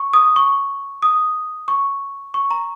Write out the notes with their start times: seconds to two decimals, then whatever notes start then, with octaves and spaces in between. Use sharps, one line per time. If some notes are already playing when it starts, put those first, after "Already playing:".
Already playing: C#6
0.13 D#6
0.36 C#6
1.02 D#6
1.68 C#6
2.34 C#6
2.51 A#5